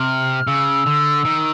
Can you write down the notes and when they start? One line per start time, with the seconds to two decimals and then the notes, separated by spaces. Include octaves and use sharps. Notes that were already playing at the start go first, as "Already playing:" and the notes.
Already playing: C3 F6
0.47 C#3 E6
0.86 D3
1.25 D#3